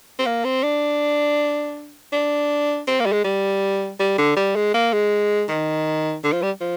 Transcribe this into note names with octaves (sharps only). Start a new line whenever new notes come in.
C4
A#3
C4
D4
D4
C4
A#3
G3
G#3
G3
G3
D3
G3
G#3
A#3
G#3
D#3
D3
F3
G3
F3